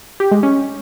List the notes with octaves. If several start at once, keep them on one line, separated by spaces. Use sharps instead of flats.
G4
G#3
C#4